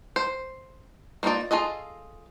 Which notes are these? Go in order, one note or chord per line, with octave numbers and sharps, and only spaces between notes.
C5
A#3 C4 D#4 F4 D5
F4 G#4 A4 D#5